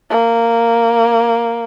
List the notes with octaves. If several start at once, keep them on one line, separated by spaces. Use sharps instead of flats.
A#3